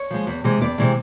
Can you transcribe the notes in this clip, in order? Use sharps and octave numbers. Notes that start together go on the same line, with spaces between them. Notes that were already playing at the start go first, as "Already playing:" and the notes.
Already playing: C#5
F3 G#3
E2
C3 E3 G#3
E2 D5
C3 E3 G#3